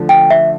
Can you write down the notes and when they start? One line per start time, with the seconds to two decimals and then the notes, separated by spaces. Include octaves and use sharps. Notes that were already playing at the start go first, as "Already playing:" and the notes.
Already playing: D3 F3 A3
0.09 G5
0.30 E5